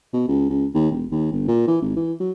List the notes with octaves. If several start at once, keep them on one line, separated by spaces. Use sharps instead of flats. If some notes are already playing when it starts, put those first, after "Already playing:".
B2
C#2
C#2
D#2
E1
D#2
G1
A#2
E3
G#1
E3
F#3